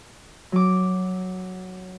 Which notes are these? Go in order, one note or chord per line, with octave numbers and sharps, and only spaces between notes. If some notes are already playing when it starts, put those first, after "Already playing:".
F#3 D6